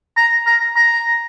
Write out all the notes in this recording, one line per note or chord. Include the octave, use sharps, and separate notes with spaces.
A#5
A#5
A#5